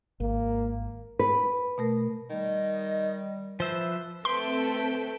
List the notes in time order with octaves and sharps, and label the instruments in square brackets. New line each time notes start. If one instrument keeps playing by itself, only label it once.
[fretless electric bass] G#1 [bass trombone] A#3
[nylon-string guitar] B4
[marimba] B2 A3 A#4
[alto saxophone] D#3 [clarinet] G3 [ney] D#5
[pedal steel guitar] F3 E5 [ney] B4 [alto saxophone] C5
[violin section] A3 C4 A4 [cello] B4 G5 [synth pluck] C6